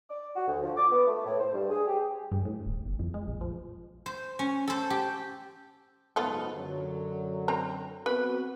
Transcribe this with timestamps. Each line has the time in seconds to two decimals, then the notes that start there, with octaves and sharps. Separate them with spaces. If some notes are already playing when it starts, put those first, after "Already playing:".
0.10 D5
0.35 F#4
0.48 D2
0.62 F3
0.76 D6
0.90 B3
1.07 A3
1.25 A2
1.38 C5
1.53 G2
1.69 G#4
1.87 G4
2.31 G2
2.45 A2
2.66 D1
2.86 G1
2.99 F2
3.14 G#3
3.27 A#1
3.41 F3
4.06 C5
4.39 C#4
4.68 A4 C5
4.90 G4
6.16 F#1 G#2 B3 F4 A4
6.55 F#2 D3 F#3
7.48 C4 A#5
8.06 B3 C4 F#4 B4